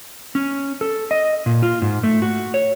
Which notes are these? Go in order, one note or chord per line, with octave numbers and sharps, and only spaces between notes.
C#4
A4
D#5
A#2
F4
G#2
A3
F#4
C#5